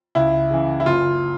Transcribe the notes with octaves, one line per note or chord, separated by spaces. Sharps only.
C#2 E4
C#3 E3
E4
F#1 F4